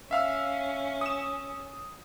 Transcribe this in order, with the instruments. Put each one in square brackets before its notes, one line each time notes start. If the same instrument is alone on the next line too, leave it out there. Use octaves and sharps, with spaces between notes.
[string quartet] C#4 [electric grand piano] E5 F5 E6
[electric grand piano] D#6 E7